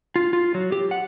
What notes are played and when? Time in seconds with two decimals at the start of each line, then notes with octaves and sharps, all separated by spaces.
0.16 F4
0.33 F4
0.54 F#3
0.72 G4
0.91 F#5